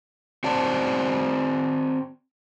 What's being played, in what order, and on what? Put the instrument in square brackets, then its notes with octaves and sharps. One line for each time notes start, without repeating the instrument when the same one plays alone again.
[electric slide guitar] C4 F#4 C5 D5 A5